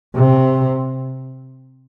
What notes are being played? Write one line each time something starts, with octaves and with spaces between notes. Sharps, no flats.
C3